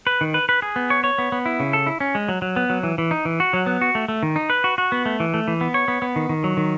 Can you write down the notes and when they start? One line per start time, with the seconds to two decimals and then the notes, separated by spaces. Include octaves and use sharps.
0.07 B4
0.21 D#3
0.34 B4
0.49 B4
0.62 G#4
0.76 B3
0.90 C#5
1.04 C#5
1.18 B3
1.32 B3
1.46 E4
1.60 C#3
1.73 A4
1.87 E4
2.00 C#4
2.15 G#3
2.29 F#3
2.42 F#3
2.56 B3
2.70 F#3
2.83 E3
2.98 E3
3.11 D#4
3.25 E3
3.40 F#4
3.53 F#3
3.66 B3
3.81 F#4
3.95 A3
4.09 A3
4.23 D#3
4.36 D#4
4.50 B4
4.64 F#4
4.78 F#4
4.92 B3
5.06 A3
5.20 E3
5.34 A3
5.48 E3
5.61 B3
5.74 C#5
5.88 B3
6.02 B3
6.16 D#3
6.29 D#3
6.44 F#3
6.57 D#3